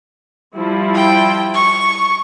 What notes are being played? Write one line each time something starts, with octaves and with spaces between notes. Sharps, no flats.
F3 G3 E4
G5
C#6